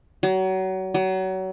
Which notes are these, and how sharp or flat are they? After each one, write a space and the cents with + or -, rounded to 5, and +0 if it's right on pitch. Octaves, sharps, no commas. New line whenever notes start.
F#3 +30
F#3 +30